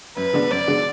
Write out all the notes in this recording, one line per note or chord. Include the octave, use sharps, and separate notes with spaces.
F#2 B4
D3 G#3 B3 D4
F#2 D5
D3 G#3 B3 D4